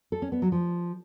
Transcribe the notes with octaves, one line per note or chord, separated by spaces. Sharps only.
A4
C#4
B3
F#3
F3